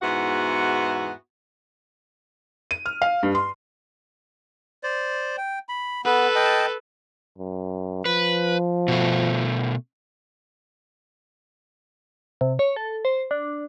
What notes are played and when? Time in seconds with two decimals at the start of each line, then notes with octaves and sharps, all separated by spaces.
0.02 E2 G#2 B3 E4 F#4 F#5
2.71 D#7
2.86 F6
3.02 F5
3.23 G2
3.35 C6
4.83 C5 D5
5.38 G5
5.69 B5
6.04 B3 A4 B4
6.35 D#5 G5 A5
7.38 F#2
8.05 F3 B4
8.88 B2 A3
12.41 C3
12.59 C#5
12.76 A4
13.05 C5
13.31 D4